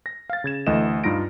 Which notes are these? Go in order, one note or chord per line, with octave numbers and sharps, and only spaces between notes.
A#6
F5 A6
C#3 G#6 E7
D2 E3 A3 D#5 E7
G2 G3 D#4 F4 A#6 D7